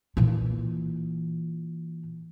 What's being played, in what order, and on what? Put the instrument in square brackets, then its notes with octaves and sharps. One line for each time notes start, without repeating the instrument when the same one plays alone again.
[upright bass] A#2 E3